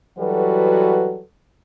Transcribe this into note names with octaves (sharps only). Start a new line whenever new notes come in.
E3 F#3 G3 F#4 A4 B4